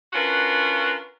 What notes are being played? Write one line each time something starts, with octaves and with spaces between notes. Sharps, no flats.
C#4 D4 F4 F#4 A#4 B4